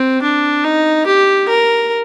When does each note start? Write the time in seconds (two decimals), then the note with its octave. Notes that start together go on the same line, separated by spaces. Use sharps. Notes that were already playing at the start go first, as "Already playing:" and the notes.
Already playing: C4
0.23 D4
0.65 D#4
1.07 G4
1.49 A#4